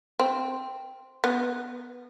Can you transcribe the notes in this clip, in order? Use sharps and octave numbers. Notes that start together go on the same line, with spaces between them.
C4
B3